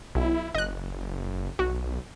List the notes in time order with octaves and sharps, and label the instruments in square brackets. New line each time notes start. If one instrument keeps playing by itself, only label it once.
[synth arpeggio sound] B1 [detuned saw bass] E4
[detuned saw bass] F#1 [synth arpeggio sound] D#5 F#6
[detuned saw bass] B1 [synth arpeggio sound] F#4